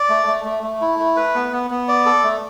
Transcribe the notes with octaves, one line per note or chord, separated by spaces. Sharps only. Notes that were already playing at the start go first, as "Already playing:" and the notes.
Already playing: D5
A3
A3
A3
A3
E4
A3
B4
B3
B3
B3
D5
A4
A3